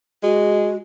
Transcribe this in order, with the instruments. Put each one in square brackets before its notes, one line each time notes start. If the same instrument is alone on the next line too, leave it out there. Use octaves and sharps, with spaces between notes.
[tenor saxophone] G#3 [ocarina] F#4